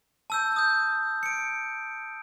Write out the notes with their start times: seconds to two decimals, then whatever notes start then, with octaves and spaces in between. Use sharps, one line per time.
0.30 A5 E6 G6
0.56 D#6 G6
1.23 C#7 D7